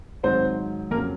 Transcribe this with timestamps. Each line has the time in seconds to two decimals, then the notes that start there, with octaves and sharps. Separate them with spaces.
0.23 G#2 D#3 F#3 C4 C5
0.91 F2 C#3 F#3 A#3 A#4